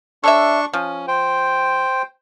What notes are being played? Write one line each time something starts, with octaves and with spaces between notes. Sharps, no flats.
D4 A4 C#5 E5 C#6
F3 C#4
C5 G5